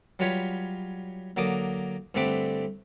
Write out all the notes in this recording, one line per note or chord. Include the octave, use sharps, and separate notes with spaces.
F#3 G3 F4 B4 C#5
D3 F#3 A#3 D6 D#6
G2 D3 A3 C4 B4 D6